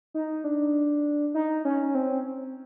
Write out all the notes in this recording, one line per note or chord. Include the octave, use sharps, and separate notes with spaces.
D#4
D4
D#4
C#4
C4